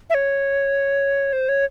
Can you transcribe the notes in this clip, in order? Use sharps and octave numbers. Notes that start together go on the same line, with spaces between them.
E5
C#5
C5
C#5